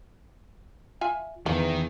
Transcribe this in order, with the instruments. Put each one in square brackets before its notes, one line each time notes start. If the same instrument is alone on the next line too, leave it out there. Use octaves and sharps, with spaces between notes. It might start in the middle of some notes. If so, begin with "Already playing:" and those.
[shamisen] F4 E5 G#5
[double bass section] E2 [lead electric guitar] D#3 [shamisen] A#3